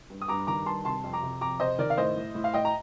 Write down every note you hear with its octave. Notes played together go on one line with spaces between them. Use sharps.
G2
D#6
G2 A#5 D6
D#3 A#5 D6
G2 A5 C6
C3 A5 C6
F2
A#5 D6
C3
F2 A#5 D6
C3 C5 D#5
D#3 A#4 D5
F5
A2 C5 D#5
A2
A2
F5
A2 D#5 G5
A#5